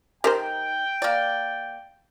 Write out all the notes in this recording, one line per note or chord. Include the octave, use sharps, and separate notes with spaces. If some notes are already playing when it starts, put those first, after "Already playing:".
D#3 G4 A#4 C5 G5
A#3 D5